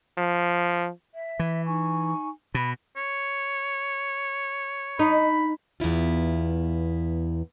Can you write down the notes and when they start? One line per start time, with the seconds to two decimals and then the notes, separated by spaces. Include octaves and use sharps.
0.17 F3
1.14 E5
1.39 E3
1.66 D#4 G#5 C#6
2.54 B2 B5
2.97 C#5
4.99 D#4 B5
5.80 E2 B3 E4 F4